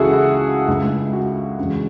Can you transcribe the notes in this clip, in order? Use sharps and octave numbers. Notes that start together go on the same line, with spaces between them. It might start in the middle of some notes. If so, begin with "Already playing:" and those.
Already playing: C#2 C#3 E3 G#3 E4 F#4 G#4 A4
E4
C#2 C#3 G#3
F#4
E2 C#3 G#3